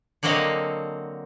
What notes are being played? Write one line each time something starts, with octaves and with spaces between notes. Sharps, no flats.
D3 F#3 A#3 C4 D#5 F5